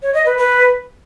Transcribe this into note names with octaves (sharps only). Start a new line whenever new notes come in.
C#5
D#5
B4
B4